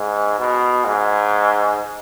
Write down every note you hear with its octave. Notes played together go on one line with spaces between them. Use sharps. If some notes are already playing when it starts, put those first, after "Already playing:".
Already playing: G#2
B2
G#2